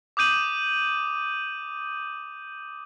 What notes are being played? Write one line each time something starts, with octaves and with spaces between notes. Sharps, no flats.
D6 D#6 G6 D#7 F#7